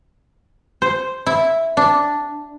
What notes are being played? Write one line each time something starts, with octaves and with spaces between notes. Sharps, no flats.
C5
E4
D4